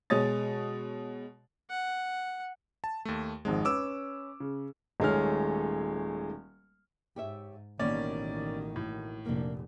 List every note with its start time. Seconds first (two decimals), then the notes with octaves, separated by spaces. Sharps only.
0.10 B2 G#3 C#5 D#6 A6
1.70 F#5
2.84 A5
3.05 D#2 A3
3.45 G#1 F2 G#2 G#3
3.65 C#4 B4 D6 E6
4.40 C#3
5.00 D#1 D#3 G#3 A3 C#5 F6
7.16 G#2 G4 C#5 E5
7.79 A1 B2 D#3 G3 A#3 C#4 D5
8.76 A2
9.26 F1 A#2 A#3 D4